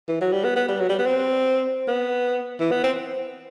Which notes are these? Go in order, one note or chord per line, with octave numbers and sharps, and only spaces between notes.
E3
F#3
G3
B3
B3
G3
F#3
G3
B3
C4
B3
E3
B3
C4